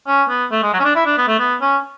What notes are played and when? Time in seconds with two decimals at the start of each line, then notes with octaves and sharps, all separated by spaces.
0.07 C#4
0.29 B3
0.52 A3
0.63 G#3
0.73 F#3
0.80 C#4
0.84 D4
0.96 E4
1.06 D4
1.18 B3
1.28 A3
1.39 B3
1.61 C#4